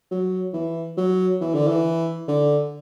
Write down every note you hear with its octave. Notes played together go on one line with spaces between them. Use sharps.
F#3
E3
F#3
E3
D3
E3
D3